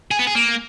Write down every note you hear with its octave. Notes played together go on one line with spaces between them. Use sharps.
G#4
B3
G#4
A#3